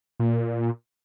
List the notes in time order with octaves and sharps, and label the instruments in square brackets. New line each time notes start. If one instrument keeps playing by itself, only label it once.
[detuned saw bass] A#2